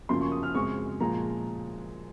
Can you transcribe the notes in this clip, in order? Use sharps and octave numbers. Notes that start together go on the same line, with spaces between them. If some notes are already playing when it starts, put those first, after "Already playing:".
F#2 C#3 F3 A#3 C6
C#6
D#6
F6
F#2 C#3 G#3 C4 C#6
A#2 F3 G#3 A#5